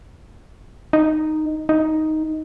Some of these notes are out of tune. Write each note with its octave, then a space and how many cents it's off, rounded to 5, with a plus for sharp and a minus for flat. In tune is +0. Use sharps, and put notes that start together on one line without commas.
D#4 -5
D#4 +5